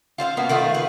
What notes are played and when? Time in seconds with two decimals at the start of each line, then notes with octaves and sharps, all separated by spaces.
0.18 F4 C5 E5 F5
0.37 A#3 B3 C#4 F#4
0.49 D#3 A3 F4 F#4
0.74 G#4 B4